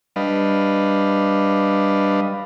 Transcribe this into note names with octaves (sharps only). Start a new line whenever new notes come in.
G3 D4 B4 D#5 F5